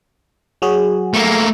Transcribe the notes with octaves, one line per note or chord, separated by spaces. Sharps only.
F#3 F#4 G#4
A3 A#3